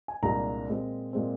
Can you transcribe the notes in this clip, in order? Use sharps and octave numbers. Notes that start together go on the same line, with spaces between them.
G#5
C2 A#2 G#3 D4 A#5
A#2 G#3 C4
A#2 G#3 C4